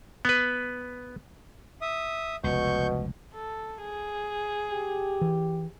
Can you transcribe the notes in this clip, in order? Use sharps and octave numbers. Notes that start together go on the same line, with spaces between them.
B3 B4
E5 D#6
F1 C#2 B2 C#6 G6
A4
G#4
G4
E3